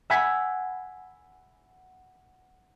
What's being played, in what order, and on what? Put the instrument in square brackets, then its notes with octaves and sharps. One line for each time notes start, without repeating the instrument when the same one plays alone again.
[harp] E5 F#5 G#5 B5 G#6 B6